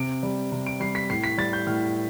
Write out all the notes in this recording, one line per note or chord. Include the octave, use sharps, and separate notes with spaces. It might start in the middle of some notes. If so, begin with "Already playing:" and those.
Already playing: C3 D7
G3
C3
D7
G3 C7
B6
A2 C7
B6
G3 A6
G6
A2 F6